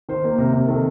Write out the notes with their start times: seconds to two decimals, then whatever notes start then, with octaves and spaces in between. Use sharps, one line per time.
0.09 D#3 C5
0.24 A#3
0.38 C3 A#4
0.53 C3
0.68 D#3 A4